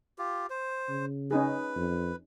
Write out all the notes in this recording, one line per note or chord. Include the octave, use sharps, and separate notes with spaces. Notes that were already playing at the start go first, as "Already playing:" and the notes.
F4 G4
C5
C#3
C#4 D#4 G#4 B4
F2